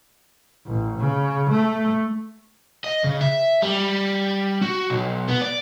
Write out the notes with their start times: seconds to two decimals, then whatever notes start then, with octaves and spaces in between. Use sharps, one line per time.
0.66 A1
0.99 C#3
1.50 A3
2.84 D#5
3.04 C#3
3.21 E5
3.62 G3
4.62 F#4
4.90 B1
5.28 B3
5.41 D5